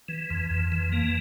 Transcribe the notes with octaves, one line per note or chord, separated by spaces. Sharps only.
E3
F2
F2
E3
E3 A#3